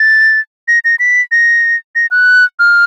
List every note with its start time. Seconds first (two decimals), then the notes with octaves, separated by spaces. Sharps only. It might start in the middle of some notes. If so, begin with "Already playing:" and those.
Already playing: A6
0.68 A#6
0.84 A#6
0.99 B6
1.32 A#6
1.95 A#6
2.11 F#6
2.59 F6